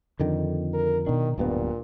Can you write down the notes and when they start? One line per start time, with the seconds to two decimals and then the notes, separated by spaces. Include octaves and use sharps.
0.20 F2 D3 D#3
0.73 A#4
1.07 B2 D#3 D4
1.38 D1 G2 A#2 B3